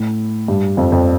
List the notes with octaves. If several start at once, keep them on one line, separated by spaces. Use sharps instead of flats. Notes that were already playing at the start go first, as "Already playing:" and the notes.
Already playing: A2
G2
F2
F2